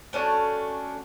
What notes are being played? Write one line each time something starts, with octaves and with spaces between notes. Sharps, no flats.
A3 C#4 D4 F#4